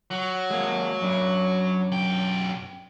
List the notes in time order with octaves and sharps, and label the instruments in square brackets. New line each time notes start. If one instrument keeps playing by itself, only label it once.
[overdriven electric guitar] F#3
[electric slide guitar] G#3 A#3
F#2 D4
[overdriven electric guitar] B1 G5